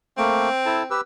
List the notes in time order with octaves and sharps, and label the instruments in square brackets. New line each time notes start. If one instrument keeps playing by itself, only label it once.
[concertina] A3 A#3 [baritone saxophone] C4
[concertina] E4 A4 A5
G4 B4 E6